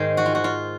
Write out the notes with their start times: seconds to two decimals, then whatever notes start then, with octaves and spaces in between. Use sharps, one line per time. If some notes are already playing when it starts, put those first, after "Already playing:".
Already playing: G#2 D#3 G#3 C5
0.17 F#4
0.26 F4
0.35 F#4
0.44 F4